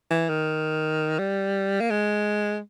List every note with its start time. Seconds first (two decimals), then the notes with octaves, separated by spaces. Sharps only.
0.11 E3
0.29 D#3
1.19 G3
1.81 A#3
1.90 G#3